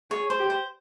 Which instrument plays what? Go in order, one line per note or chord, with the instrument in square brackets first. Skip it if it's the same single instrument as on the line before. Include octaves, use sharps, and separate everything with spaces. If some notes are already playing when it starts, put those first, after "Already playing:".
[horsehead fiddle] G#4 [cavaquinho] C#5
[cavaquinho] C5
[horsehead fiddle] G4
[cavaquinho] C5